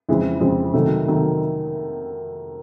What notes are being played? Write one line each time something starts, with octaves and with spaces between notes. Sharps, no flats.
F2 C#3 E3 G#3 C4
F2 C#3 E3 G#3 C4
C3 D#3 F#3 A3
C3 D#3 F#3 A3